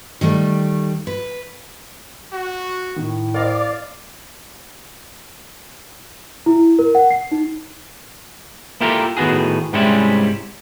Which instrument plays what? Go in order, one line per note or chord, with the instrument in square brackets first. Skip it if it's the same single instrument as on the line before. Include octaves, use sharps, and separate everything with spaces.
[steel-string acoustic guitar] D#3 G3 A3
B4
[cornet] F#4
[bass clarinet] A2 [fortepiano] D#3
[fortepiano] A#4 C5 D#5 [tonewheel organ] D5 [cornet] F5
[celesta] E4
A#4
F#5
C7
D#4
[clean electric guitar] A#3 E4 F4 G4 A4 A#4
A2 D#3 B3 F#4 G#4
G#2 C3 G3 G#3 C#4 E4